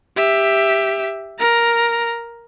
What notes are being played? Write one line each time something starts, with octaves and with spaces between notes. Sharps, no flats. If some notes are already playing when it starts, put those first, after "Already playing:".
G4 E5
A#4 A#5